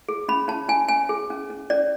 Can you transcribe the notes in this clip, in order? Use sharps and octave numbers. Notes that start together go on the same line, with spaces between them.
G#4
C#4 B5
C#4 A5
C#4 G#5
C#4 G#5
G#4
C#4
C#4
C#4 D5